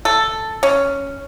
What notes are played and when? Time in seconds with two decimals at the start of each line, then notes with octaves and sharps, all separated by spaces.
0.05 A4
0.63 C#4